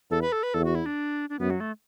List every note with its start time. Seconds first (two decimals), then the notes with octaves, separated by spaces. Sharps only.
0.10 E2 A4
0.22 B4
0.32 A4
0.43 B4
0.54 E2 A4
0.64 F#4
0.75 E4
0.86 D4
1.30 D4
1.39 F#2 B3
1.50 F#3
1.60 A3